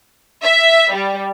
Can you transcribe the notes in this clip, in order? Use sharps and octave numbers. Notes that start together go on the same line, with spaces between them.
E5
G3